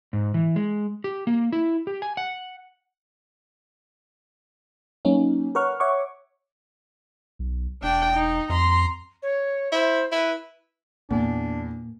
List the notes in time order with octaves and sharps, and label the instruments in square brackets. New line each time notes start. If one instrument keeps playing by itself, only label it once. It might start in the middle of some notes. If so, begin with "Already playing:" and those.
[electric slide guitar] G#2
E3
G#3
G4
A#3
E4
G4
G#5
F#5
[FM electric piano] F#3 A#3 C#4 D#4
A#4 B4 C#5 F#5 C#6 F6
C#5 E5 F#5 C#6 D6
[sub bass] B1
[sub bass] E1 [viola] D4 G5
[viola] D#4
[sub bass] F2 [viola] A#5 C6
[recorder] C#5
[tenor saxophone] E4 [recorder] C5
[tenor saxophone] E4 [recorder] B4
[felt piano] E2 [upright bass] A#2 [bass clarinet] D4